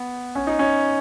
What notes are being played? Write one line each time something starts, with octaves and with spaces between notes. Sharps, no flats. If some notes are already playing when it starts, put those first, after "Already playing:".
Already playing: B3
C#4
D#4
C#4